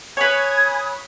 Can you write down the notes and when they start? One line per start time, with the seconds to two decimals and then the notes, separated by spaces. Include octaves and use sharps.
0.17 B4 C#5 G#5 B5 D#6 G#6